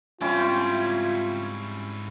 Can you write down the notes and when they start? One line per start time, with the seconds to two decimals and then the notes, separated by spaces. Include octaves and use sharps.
0.21 G#2 G3 C4 C#4 E4 F4 D5